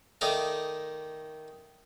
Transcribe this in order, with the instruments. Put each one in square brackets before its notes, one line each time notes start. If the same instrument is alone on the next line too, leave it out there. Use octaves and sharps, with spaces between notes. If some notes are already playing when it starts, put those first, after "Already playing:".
[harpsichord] D#3 A3 D5 D#5 F5